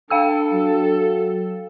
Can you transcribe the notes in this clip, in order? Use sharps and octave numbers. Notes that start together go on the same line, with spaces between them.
D4 A4 F5 G5 E6
F#3